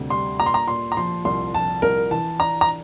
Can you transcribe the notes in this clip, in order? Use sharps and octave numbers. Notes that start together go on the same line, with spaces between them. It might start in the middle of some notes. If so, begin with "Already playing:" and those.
Already playing: D2 C3 G3
G3 C6
A#2 A#5
C6
A#5
A#2 C6
A#5
F3 C6
C2 C6
F3 A5
C2 A#4
E3 A5
D4 A#5
A#5